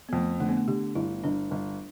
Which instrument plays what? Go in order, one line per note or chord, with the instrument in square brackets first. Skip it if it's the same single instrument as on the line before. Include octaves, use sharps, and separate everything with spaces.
[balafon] B3
[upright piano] F2 [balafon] A3
[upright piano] D3 [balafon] A3
[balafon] B3
A3
[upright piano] D3 [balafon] G4
[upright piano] G1 [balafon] E4
[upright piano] G1 [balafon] D4
[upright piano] G1